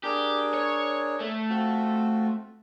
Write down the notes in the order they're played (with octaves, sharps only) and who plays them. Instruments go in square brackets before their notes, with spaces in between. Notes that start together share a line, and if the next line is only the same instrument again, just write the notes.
[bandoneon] D4 G#4 A#4 [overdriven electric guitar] G4
[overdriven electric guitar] C#5
A3
[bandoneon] C4 F4 F#4